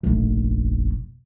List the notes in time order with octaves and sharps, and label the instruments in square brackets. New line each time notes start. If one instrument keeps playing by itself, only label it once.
[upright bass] F1 A#1